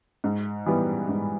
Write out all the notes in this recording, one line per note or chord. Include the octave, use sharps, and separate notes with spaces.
G#2
E3 G3 B3
G#2